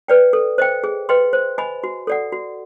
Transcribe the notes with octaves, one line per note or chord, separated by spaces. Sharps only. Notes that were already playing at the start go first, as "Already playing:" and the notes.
B4 D5 G5
A4
C5 D#5 G5
G#4
B4 D#5 G5 C6
C5
D#5 G#5 B5
F#4
A4 D5 F#5
F#4